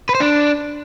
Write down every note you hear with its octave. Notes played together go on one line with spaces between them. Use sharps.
B4
C5
D4